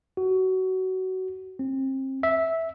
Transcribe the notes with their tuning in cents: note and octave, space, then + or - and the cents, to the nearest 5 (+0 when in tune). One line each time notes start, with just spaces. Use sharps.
F#4 +20
C4 +30
E5 -10